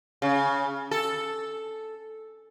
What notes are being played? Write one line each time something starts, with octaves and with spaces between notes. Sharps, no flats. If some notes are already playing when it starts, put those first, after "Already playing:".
C#3
A4